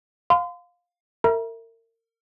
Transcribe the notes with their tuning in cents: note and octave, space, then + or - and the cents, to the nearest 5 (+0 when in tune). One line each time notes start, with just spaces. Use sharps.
F5 +20 C6 -35
A#4 -35 E5 +0 A#5 +35